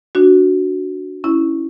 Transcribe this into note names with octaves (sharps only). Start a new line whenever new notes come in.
D4 F#4
C#4 E4